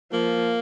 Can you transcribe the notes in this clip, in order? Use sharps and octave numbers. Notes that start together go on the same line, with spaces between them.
F3 A#3